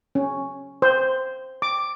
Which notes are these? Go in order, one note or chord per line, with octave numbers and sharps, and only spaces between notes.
C#4
C5
D6